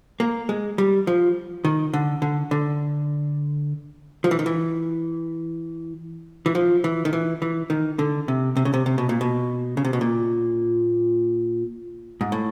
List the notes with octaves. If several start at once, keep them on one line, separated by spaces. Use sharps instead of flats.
A#3
G#3
G3
F3
D#3
D3
D3
D3
F3
E3
D#3
E3
E3
F3
E3
D#3
E3
E3
D#3
D3
C3
C3
C#3
C3
C3
B2
A#2
B2
C#3
C3
B2
A#2
G#2
A2